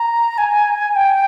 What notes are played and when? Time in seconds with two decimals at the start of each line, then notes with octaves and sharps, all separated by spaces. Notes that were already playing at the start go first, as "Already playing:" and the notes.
Already playing: A#5
0.38 G#5
0.96 G5